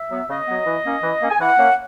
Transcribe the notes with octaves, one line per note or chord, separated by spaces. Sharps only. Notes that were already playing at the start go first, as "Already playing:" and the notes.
Already playing: E5
F#3 B3
C#3 D#5
F#3 B3
E3
A#3 C#4
E3
A#3 C#4
G#5
E3 F#5
A#3 C#4